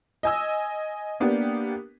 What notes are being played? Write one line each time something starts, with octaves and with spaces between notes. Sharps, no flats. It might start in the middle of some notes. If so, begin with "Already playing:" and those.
D#5 G#5 E6
A#3 B3 D4 G4